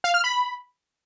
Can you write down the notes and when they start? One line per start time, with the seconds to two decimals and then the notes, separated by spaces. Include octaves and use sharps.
0.04 F5
0.14 F6
0.24 B5